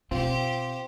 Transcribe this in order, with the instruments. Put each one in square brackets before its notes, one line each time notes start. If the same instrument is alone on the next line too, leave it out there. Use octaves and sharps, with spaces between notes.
[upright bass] B2 [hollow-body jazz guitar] C4 F4 [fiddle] G4 C5